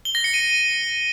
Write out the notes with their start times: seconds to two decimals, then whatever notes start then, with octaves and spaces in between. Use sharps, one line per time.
0.05 G7
0.15 A#6
0.24 C#7
0.34 D#7